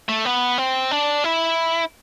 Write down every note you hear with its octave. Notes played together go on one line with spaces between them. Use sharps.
A3
B3
C4
D4
E4